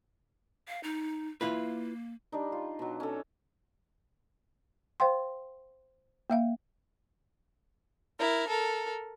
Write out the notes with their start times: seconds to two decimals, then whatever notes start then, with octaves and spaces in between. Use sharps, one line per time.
0.68 F5
0.83 D#4
1.41 A#3 E4 F4 B4
2.32 G3 D4 D#4
2.52 F4
2.79 B2 F#3
3.00 C#4 A4
5.00 C5 F5 G5 C6
6.30 A#3 E5 F5
8.18 E4 A#4
8.48 A4 A#4